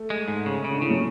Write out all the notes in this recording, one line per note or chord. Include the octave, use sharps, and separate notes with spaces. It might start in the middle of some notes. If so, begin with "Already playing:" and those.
Already playing: A3
G#3
G#2
C#3
C#3
D3
C#3 E3
F#3